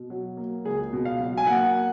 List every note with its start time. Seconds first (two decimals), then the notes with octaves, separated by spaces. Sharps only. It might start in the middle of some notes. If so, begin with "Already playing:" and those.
Already playing: B2
0.10 F#3
0.37 A#3
0.65 C#2 G#4
0.93 B2
1.05 F5
1.19 F#3
1.37 G#5
1.47 A#3 F#5